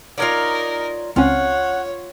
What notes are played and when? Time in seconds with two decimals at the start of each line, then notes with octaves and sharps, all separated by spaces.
0.18 D#4 F4 A#4 C#5 D5
1.16 C#2 C4 C#4 F4 C#5 F#5